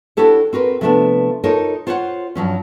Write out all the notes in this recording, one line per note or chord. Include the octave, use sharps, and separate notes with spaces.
D4 E4 F#4 G4 A4 C#5
C4 F#4 A#4 B4
C3 F3 A3 B3 C#4 D4
D#4 F4 A4 A#4 C#5
F4 C5 C#5 E5 F#5
G2 F3 F#3 C#4